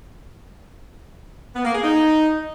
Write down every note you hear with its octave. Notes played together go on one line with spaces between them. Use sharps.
B3
A#3
G#4
D#4